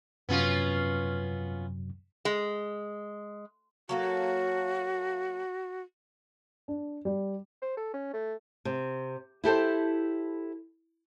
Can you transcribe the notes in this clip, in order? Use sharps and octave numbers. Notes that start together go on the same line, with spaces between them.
F#2 C3 F#3 B3 C#4 F4
G#3
F#3 A#3 F#4 A4
D4
G3
C5
A4
C#4
A3
C3
E4 G4 A4 C5